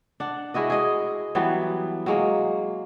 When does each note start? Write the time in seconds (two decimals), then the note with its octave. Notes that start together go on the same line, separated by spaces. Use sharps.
0.20 D4 F#5
0.54 G#3 E4 F#4 D#5
0.70 G#4 D#5
1.35 E3 F#3 G3 B3
2.06 F#3 G#3 A#3